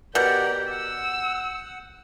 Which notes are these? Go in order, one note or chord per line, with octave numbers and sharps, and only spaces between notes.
B2 G4 A#4 D5 F#5 G6
F#5 E6